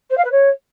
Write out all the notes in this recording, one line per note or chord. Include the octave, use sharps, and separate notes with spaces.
C5
F5
B4
C#5